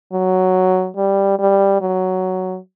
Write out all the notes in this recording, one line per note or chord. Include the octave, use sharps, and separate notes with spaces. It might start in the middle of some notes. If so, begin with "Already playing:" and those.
F#3
G3
G3
F#3